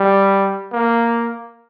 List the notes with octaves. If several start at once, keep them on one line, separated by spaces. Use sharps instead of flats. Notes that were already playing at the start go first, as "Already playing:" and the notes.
Already playing: G3
A#3